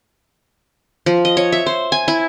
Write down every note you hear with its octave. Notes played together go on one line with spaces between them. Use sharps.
F3
D#5
C#5
E5
C5
G#5
E4